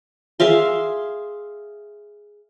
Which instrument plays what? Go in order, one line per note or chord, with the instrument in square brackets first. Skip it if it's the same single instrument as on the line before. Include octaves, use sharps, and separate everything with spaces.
[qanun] G#4 E5 F5 C6